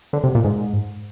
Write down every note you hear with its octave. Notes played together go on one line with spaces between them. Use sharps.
D3
C3
A#2
G#2